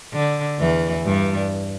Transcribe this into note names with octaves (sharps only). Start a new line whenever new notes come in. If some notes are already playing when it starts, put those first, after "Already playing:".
D3
E2 E3
G2 G3